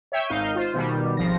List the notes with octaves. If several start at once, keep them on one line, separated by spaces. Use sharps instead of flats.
C#5 E5 G5
G#1 D#4 F5 G6 D#7
F4 C5
B2 D#3 G3
G#1 F3 A#6